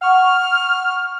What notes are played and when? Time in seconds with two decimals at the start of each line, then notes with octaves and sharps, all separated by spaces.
0.01 F#5 C#6 F6